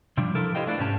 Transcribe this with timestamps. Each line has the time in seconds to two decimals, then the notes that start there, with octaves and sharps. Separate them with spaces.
0.17 C3 F3 G3 D4
0.35 F3 E4 A4 A#4
0.55 E4 G4 C5 D#5 F5 G5
0.67 A3 D4 E4 B4 D5 F5
0.79 G#2 C3 C#4 G4 A5